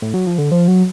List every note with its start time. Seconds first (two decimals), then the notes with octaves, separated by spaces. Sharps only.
0.02 A2
0.14 F#3
0.26 F3
0.38 D3
0.51 F3
0.68 F#3